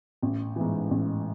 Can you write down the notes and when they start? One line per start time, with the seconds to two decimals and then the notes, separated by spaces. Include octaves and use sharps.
0.23 A1
0.56 G#2 E3
0.91 A1